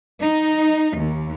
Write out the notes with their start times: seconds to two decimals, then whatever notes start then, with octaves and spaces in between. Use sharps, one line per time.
0.21 D#4
0.97 D#2